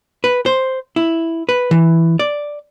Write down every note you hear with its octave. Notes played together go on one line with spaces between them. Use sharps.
B4
C5
E4
B4
E3
D5